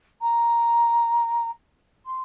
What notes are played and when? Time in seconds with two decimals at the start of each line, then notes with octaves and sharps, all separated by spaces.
0.22 A#5
2.06 C6